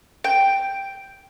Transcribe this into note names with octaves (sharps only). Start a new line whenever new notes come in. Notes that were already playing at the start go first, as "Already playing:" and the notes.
G5